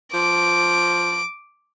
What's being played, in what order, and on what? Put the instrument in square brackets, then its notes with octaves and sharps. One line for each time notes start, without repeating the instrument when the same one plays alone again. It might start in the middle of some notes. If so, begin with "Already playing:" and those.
[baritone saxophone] F3 [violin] D6